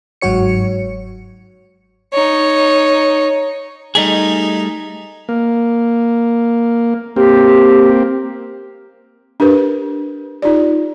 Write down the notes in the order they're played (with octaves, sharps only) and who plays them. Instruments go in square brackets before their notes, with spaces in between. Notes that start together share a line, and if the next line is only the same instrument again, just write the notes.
[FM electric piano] G1 G#2 F#3 F#4 C#5 C#7
[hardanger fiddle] D#4 C#5
[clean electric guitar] G3 A3 G#4 [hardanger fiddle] D#4 D#5
[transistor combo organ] A#3
[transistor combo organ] A#3 C4 [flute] G4
[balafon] D4 G4 A#4 B4
D#4 F4 G4 D5